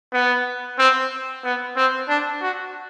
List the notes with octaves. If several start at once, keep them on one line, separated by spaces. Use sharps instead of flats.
B3
C4
B3
C4
D4
F#4